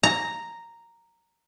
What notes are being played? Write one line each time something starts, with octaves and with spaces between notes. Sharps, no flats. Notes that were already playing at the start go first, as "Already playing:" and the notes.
A#5